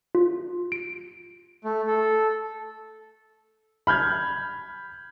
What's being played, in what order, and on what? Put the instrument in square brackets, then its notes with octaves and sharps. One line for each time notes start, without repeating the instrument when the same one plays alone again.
[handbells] F4
D7
[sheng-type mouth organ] A3
A4
[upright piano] B5 F6 G6 G#6